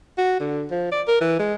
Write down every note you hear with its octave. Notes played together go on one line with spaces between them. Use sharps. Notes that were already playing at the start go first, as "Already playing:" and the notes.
F#4
D3
F3
D5
A#4
E3
G#3